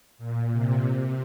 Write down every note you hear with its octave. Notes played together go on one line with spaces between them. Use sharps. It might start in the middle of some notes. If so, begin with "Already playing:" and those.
A#2
C3
C3